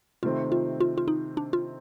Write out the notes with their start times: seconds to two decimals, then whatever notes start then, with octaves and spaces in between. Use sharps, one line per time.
0.23 C3 D#3 A3 C4 F4
0.52 F4
0.80 F4
0.98 F4
1.08 D#4
1.37 D4
1.53 F4